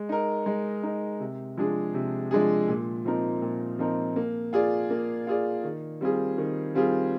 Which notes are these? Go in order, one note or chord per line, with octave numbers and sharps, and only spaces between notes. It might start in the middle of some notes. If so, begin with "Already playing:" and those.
Already playing: G#3
D#4 A#4
G#3
D#4 A#4
C3
F3 G#3 D4 G#4
C3
F3 G#3 D4 G#4
A#2
F3 C4 D#4 A#4
A#2
F3 C4 D#4 A#4
A#3
F4 G#4 D5
A#3
F4 G#4 D5
D#3
G3 C4 F4 G#4
D#3
G3 C4 F4 G#4